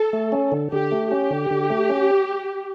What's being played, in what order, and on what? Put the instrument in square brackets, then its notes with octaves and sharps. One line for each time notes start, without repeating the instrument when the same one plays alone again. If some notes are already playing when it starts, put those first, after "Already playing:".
Already playing: [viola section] A4
[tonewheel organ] A3
C#4
D3
[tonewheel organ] D3 [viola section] G4
[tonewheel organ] A3
[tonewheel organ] C#4 [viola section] G4
[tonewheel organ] D3
D3
A3
C#4